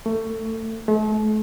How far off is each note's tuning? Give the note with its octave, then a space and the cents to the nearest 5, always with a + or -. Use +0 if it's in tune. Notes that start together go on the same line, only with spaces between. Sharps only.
A3 +25
A3 -40